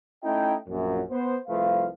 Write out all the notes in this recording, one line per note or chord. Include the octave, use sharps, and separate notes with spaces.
A3 C#4 D#4 E4 D#5 G5
A#1 F#2
B3 C5
C2 F3 A3 B4 F5